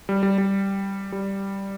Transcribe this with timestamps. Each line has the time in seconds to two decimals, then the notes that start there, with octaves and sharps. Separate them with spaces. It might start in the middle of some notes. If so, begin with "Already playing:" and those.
0.09 G3
0.23 G3
0.38 G3
1.12 G3